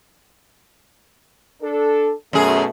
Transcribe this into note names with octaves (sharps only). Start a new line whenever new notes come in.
D4 A4
F#2 B2 A3 G#4